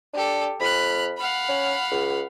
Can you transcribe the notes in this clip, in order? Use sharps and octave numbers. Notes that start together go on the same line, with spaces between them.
D4 G4 A4
F2 B5 F6 F#6
F5 F#5 B5
C#4
C#2